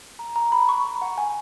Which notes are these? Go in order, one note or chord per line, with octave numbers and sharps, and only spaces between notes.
A#5
A#5
B5
C#6
A#5
F#5
G#5